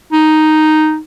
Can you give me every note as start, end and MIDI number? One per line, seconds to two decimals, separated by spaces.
0.12 0.99 63